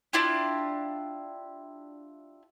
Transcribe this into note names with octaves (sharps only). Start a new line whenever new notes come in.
D4 E4 F4 G4